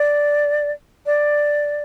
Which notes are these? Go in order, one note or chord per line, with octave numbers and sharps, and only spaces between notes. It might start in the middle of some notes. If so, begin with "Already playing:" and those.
Already playing: D5
D5